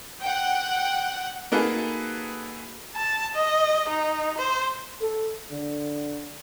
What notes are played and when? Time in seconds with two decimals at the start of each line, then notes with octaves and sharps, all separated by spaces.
0.22 F#5 G5
1.52 A#3 D#4 F#4 G#4 A4 B4
2.96 A5
3.35 D#5
3.89 D#4
4.38 C5
5.02 A4
5.52 D3